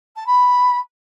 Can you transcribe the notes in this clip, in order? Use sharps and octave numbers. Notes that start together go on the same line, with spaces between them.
A5
B5